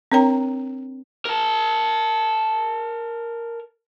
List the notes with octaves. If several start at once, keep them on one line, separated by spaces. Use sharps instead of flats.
C4 D4 A#4 C#5 G5 A#5
A#4 A5